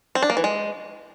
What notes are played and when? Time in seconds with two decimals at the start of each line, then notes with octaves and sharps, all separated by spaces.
0.15 C4
0.23 D4
0.30 A#3
0.37 E3
0.44 G#3